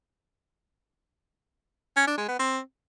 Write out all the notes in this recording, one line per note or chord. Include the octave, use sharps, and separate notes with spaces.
C#4
D4
G#3
B3
C4